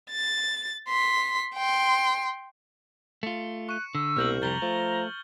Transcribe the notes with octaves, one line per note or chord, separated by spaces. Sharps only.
A6
C6 B6
G5 C6
A3 F4 C#7
C#6 F#6 D#7
D3 E6
C2 B2 A#3 D4 F6 G6 F#7
F2 C3 G3 A#5 G6 A6 G7
F3 A3